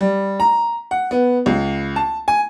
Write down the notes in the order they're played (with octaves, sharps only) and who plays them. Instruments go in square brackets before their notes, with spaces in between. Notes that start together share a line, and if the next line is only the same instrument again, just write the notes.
[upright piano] G3
A#5
F#5
B3
C#2
A5
G#5